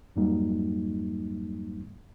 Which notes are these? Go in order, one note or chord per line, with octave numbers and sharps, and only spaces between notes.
F2 G#2 F#3 G3 A#3 D#4